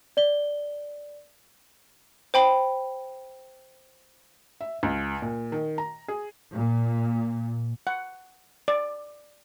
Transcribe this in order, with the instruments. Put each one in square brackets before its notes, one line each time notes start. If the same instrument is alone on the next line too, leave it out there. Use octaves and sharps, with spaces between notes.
[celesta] D5 G7
[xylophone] C5 G5 B5
[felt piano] E5
C#2
A#2
D#3
A#5
G#4
[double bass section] A#2
[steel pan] F#5
D5